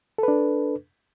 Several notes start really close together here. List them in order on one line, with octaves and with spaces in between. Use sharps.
A4 B4 D4